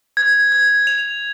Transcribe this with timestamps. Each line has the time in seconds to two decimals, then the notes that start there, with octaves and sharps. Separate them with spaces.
0.17 G#6
0.52 G#6
0.87 F7